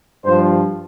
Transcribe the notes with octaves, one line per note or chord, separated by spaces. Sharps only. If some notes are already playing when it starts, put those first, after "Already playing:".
G2 F3 C5